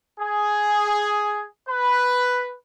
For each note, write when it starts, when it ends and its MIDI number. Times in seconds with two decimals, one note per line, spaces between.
0.20 1.45 68
1.69 2.54 71